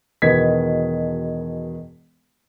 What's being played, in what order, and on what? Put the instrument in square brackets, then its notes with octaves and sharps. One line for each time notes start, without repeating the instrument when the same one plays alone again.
[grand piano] E1 B2 D#3 B4 G#6 B6